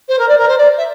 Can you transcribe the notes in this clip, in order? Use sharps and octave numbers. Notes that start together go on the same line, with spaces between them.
C5
A#4
D5
A#4
C5
D5
E5